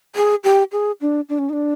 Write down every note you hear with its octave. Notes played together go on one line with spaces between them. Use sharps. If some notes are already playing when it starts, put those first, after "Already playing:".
G#4
G4
G#4
D4
D4
C#4
D#4
D4